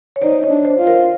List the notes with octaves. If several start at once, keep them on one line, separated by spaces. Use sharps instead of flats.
C#5
D#4 C5 D5
C#5 D#5
D4
C5 D5
F4
A#4 C5